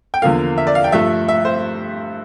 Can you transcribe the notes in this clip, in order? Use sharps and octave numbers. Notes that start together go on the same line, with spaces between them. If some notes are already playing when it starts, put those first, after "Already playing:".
G5
E2 D3 F3 A#3 F5
E5
D5
F5
G5
G2 F3 A3 E5
E5
C5